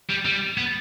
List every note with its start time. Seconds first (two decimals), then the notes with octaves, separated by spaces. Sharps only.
0.10 G3
0.25 G3
0.58 B3